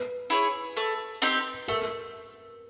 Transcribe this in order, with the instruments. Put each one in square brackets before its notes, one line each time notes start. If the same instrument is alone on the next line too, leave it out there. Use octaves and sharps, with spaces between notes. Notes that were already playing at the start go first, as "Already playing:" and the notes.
Already playing: [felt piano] B4
[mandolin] E4 G#4 C#5
A3
C4 D#4 G4
[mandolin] A3 [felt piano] A#4